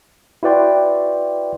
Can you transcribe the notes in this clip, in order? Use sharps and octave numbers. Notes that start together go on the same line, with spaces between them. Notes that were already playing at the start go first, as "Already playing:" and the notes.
E4 F#4 B4 D5 G5 C6